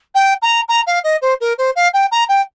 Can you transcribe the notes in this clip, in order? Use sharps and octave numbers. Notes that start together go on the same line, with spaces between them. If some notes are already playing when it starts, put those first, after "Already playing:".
G5
A#5
A#5
F5
D#5
C5
A#4
C5
F5
G5
A#5
G5